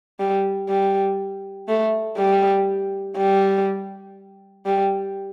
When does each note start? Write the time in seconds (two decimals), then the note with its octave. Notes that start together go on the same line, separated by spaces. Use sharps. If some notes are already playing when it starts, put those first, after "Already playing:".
0.19 G3
0.69 G3
1.68 A3
2.18 G3
3.17 G3
4.66 G3